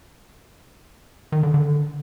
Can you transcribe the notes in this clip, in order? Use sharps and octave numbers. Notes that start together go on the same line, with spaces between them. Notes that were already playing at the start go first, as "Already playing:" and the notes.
D#3
D3
D3